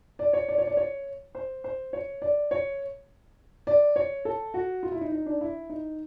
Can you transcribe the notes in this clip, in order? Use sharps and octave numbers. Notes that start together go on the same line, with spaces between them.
D5
C#5
D5
C#5
D5
C#5
C5
C5
C#5
D5
C#5
D5
C#5
A4
F#4
F4
E4
D#4
D#4
D4
E4
D#4